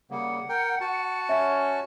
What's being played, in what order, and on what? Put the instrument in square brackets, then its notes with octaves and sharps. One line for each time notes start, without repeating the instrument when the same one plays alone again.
[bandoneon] C#3 G3 A#3 [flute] F#5
[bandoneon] A#4 G5
F#4 A5
[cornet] C#4 [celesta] E5